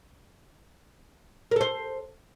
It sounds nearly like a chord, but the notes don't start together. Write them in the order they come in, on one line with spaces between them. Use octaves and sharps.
A#4 A4 C5